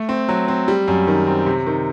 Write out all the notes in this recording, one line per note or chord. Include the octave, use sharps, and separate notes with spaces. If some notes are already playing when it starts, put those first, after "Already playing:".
Already playing: A3
C4
F#3
C4
G3
F#2
D#3
C4
C3
D#3